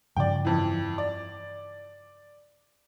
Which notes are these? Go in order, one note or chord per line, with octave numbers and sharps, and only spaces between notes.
G2 C#3 F3 D5 G5
F2 E3
D5